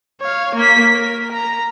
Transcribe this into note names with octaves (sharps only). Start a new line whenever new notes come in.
C#5 F5
A#3 B6
A#4
A#5